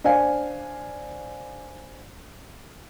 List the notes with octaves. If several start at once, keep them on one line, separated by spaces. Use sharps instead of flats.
D4 C5 F5 G#5